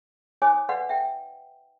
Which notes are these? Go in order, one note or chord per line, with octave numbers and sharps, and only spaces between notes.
D#4 C5 C#5 G#5 D6 D#6
B4 D5 D#5 F5 F#5 C6
E5 G5